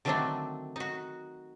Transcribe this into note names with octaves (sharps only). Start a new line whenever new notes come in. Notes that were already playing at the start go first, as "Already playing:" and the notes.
D3 D#3 F#3 A3 C4 D4
D#4 F#4